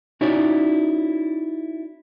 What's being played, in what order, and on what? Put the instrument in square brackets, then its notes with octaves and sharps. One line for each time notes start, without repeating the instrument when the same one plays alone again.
[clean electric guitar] C#4 D#4 E4 F#4 C#5 D5